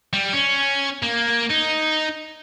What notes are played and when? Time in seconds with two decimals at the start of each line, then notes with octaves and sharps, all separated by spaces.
0.13 G3
0.33 C#4
1.03 A#3
1.50 D#4